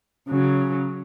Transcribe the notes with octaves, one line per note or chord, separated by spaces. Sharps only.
C#3 F#3